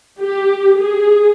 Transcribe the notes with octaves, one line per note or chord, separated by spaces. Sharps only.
G4
G#4